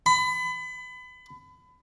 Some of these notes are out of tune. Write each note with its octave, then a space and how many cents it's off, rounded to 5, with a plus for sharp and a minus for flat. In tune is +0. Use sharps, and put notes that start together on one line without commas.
B5 +30